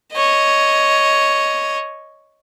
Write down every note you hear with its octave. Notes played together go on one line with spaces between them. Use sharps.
C#5 D#5